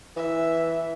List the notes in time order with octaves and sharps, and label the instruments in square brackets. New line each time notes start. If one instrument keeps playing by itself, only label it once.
[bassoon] E3 [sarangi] E5